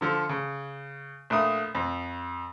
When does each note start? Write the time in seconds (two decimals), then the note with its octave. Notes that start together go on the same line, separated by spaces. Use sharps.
0.01 D3 F3 A4
0.29 C#3
1.30 A#1 A3 D#6
1.75 F2